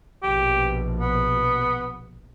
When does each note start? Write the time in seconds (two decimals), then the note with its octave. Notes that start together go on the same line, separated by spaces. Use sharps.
0.23 A#1 B2 G4
1.00 B3